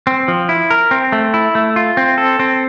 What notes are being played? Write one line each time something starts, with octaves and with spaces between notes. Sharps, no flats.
C4
F3
E4
A#4
C4
A3
E4
A3
F4
C4
A4
C4